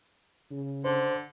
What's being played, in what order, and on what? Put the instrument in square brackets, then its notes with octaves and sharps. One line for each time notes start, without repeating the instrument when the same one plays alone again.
[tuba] C#3
[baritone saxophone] D3 [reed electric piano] C5